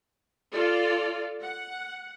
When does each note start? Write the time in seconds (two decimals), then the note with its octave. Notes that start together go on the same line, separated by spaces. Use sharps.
0.52 F4 A4 D5
1.41 F#5